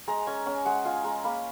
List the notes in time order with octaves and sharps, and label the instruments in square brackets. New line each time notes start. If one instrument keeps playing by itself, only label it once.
[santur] G#3 A#5
C#4 G#5
C#4 G#5
G#3 F#5
F4 G#5
G#3 A#5
A#3 B5